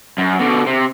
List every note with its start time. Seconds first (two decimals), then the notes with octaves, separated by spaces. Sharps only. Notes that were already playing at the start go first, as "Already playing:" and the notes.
0.18 F#2
0.40 B2 D3
0.67 C3